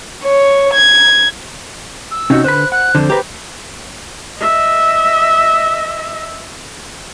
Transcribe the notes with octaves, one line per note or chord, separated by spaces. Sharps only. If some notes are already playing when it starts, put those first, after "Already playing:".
C#5
G#6
E6
C3 C#4 D#4 F#4
D3 B4 C5 B5 F#6
F#5 F#6
F2 D3 C5
G4 B4 A#5
D#5 E5